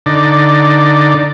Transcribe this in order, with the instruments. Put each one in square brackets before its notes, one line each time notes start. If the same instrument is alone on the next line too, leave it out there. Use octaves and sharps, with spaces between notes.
[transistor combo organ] D3 D#4 D5